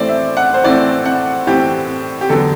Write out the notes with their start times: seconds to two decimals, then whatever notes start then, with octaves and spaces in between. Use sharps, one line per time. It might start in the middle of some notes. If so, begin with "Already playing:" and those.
Already playing: A2 E3 A3 C4 C5 D5
0.09 E5
0.37 F#5
0.54 C5
0.64 A2 E3 A3 C4 D5
1.05 F#5
1.47 A2 E3 A3 C4 G4
2.21 G4
2.29 E2 D3 F#3 B3 A4